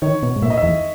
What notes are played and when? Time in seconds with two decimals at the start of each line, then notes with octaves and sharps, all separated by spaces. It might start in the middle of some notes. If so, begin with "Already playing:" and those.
0.02 D#3 C#5
0.23 B2
0.36 G#2
0.42 A#2 E5
0.50 D#5
0.57 E5
0.63 E2